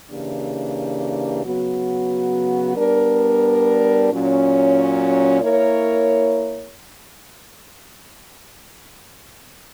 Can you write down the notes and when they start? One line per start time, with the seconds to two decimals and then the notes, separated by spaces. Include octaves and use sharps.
0.11 C#3 E3 A#3 D4 G4
1.44 C#3 F#3 B3 F#4
2.76 G3 B3 D4 A#4
4.10 A#2 F#3 C#4
5.42 A#3 E4 A#4 C#5